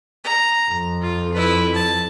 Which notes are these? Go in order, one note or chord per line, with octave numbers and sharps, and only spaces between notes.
A#5
F2
F4
E4 B4
A5